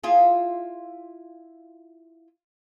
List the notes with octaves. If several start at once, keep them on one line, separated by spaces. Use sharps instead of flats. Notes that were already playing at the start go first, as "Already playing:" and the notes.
E4 F4 G#4